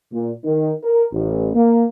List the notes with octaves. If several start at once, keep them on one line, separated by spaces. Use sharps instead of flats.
A#2
D#3
A#4
A1
A#3